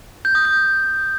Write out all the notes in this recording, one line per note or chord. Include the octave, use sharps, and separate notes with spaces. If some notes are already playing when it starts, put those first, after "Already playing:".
G6
D#6
G6